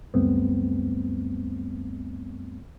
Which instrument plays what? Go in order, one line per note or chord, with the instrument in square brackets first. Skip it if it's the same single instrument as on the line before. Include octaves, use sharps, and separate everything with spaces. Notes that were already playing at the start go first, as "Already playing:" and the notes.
[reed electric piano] C#2 F#2 G3 A3 B3 C4